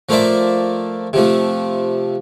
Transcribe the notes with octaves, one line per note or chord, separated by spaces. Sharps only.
F3 A3 A#3 C5 D5 E5
C3 F3 A3